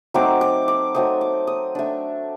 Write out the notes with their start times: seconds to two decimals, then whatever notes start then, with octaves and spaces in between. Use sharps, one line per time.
0.14 F#3 A3 C4 D#4 D6
0.41 D6
0.68 D6
0.95 F#3 A3 C4 D#4 D#6
1.21 D6
1.47 D#6
1.75 A3 D4